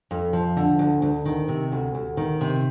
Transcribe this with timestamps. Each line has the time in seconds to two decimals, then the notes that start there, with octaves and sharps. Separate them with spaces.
0.11 F2
0.33 F3
0.57 D3
0.79 D2
1.02 D2
1.25 D#3
1.48 C3
1.72 D2
1.95 D2
2.17 D#3
2.41 C3